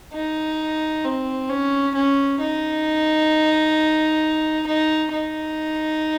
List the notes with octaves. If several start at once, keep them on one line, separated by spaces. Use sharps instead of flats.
D#4
C4
C#4
C#4
D#4
D#4
D#4